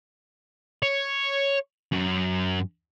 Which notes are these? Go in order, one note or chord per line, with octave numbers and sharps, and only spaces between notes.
C#5
F#2